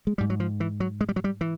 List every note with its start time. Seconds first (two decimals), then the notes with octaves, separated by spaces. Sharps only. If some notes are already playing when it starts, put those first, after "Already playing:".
0.07 G#3
0.18 G#2 G3
0.30 F#3
0.40 F3
0.60 E3
0.80 F#3
1.01 G#3
1.09 G3
1.16 F#3
1.24 G3
1.41 E3